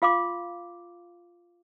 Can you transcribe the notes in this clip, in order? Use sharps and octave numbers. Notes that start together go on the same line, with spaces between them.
F4 F5 C6 D6